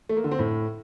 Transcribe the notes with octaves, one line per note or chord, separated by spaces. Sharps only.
A3
A#3
D3
C4
A2